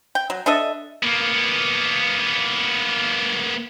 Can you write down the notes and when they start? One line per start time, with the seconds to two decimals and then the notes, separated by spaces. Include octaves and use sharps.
0.15 G5
0.30 F#3
0.46 D4 A4 D#5 E5
1.03 A#3 B3